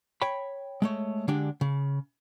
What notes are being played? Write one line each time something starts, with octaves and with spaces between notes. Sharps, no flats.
C#5 G5 B5
G#3 A3 C#5
D3 G#3 D4 G4
C#3